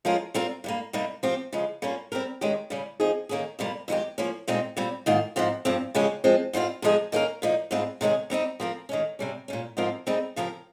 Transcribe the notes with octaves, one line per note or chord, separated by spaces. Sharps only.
F3 G#3 C#4 F4 A#4
G3 C4 F4 A#4
G2 G3 A#3
C3 G3 A#3 D#4
F3 C4 G4
C#3 F3 G#3
G3 A#3 C#4 F4
G3 C4 G4 A#4
D#3 G#3 C#4 G4
C#3 G3 C#4
F3 C4 D#4 G#4
D#3 A#3 C#4 G#4
F2 C3 G3 A#3
F2 D#3 G#3 C4 G4
F3 A#3 C#4
A#2 G#3 C4 D#4 G4
A#2 G3 C4
G#2 D#3 A#3 F4
G#2 F3 C4 F4
G2 F3 C4
C#3 F3 G#3 C#4 G4
F3 G#3 C4
G#2 G3 C4 F4
C3 F3 G#3 D#4 G#4
D#3 A#3 C#4 G4 A#4
A#2 F3 A#3 D#4
G#2 G3 C4 F4 G#4
C3 D#3 G#3 C#4 G#4
G3 C4 D#4 G4
F3 C4 F4 A#4
D#3 G#3 C#4
C3 G3 C#4
A#2 G3 C#4
G#2 F3 C4 F4 A#4
G3 C4 D#4 G#4
C#3 F3 C4 G4 A#4